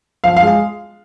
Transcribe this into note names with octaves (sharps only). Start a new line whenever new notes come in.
F3 F5
F5
G#3